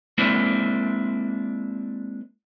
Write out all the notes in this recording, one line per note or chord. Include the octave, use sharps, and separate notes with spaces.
G#3 A#3 C4 D4 E4 C5